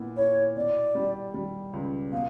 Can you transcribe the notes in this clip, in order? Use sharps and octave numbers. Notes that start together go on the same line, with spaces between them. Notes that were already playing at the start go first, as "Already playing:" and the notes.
Already playing: A#2 B3 E4
E4 C#5
B2 D5
G3
G3
C#2
B2 F5